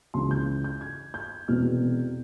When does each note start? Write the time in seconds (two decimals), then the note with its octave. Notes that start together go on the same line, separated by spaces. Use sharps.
0.14 C#2 C#3 E3 C6
0.31 G6
0.64 G6
0.81 G#6
1.14 G6
1.48 E1 E2 C3 E3 F6